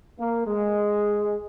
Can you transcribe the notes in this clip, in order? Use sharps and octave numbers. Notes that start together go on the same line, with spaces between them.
A#3
G#3